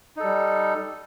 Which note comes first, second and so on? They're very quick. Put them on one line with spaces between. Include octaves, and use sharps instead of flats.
D#4 A4 G3